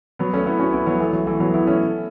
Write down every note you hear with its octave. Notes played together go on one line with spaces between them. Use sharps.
F#3 B3
A3 C#4
B3 E4
C#4 F#4
B3 E4
F#3 B3
E3 A3
F#3
E3 A3
F#3 B3
B3 E4
A3 C#4